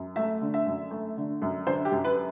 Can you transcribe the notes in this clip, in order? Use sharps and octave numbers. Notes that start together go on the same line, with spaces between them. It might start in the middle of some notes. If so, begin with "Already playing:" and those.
Already playing: F#2
A3 E5
D3
E5
F#2
A3
D3
F#2
D3 C5
G4
F#2
B4